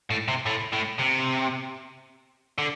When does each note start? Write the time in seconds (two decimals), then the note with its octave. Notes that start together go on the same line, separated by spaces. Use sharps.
0.11 A2
0.28 C3
0.46 A2
0.73 A2
0.99 C3
2.58 D3